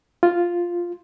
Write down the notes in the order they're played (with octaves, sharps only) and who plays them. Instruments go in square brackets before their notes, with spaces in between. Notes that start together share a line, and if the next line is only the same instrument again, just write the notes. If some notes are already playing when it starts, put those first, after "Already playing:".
[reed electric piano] F4